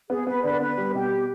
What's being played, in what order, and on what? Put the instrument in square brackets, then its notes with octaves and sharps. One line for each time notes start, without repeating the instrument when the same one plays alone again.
[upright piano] B3 [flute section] G#4
[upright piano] B3 [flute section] B4
[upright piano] D3 [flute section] B4 D5
[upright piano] B3 [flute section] B4
[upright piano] G3
[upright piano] B2 [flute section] G4